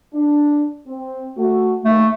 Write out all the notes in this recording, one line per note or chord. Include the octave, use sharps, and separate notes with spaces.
D4
C4
A3 F#4
D#2 A3